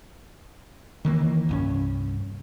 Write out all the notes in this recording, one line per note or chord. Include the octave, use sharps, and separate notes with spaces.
D#3 E3 A#3
C2 G2 C#4